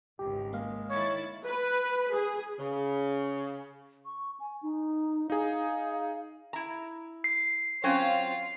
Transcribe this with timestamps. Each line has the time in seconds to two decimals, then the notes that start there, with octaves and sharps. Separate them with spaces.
0.19 G#1 C#2 G4
0.53 G#3 A#3 F5
0.90 D#3 E4 C#5 A6
1.47 B4
2.16 G#4
2.59 C#3
4.05 C#6
4.40 G#5
4.63 D#4
5.30 D#4 G#4 F5
6.53 E4 A#5
7.24 C7
7.84 F#3 C4 C#4 F4 F5